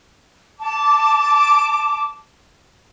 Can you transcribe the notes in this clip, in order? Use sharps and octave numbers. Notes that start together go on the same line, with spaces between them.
A5 D6